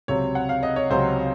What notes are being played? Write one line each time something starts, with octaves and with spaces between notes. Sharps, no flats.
C#2 C3 F#3 C4 C#5
F#5
F5
D#5
C#5
C#2 C3 F#3 C4 C5